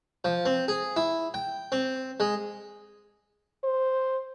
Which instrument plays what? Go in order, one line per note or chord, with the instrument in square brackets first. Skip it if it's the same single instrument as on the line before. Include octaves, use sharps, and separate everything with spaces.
[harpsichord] F3
C4
G#4
E4
G5
C4
G#3
[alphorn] C5